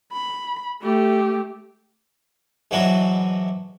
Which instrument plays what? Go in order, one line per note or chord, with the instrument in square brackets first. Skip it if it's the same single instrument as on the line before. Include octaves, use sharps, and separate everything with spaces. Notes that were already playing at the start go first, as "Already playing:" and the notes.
[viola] B5
A3 G4
[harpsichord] G#2 B2 E3 F#3 D4 F#4